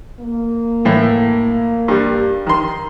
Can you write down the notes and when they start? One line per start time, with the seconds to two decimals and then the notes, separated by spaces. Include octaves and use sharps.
0.20 A#3
0.85 A2 E3
1.88 G2 G3
2.47 D#3 C6